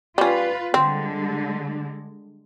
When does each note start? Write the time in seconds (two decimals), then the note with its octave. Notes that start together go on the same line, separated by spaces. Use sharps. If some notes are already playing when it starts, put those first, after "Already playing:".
0.18 G3 C#4 F4 B4
0.74 D3 G3 G#3 C4